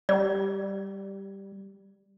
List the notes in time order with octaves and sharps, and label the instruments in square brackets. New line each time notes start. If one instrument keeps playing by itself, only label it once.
[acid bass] G3 [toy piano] D5